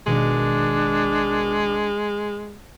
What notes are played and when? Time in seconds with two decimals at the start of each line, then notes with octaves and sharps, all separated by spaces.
0.06 G#1 B2 D#3 G#3 D4